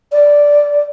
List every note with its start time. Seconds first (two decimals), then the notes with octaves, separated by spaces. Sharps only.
0.12 D5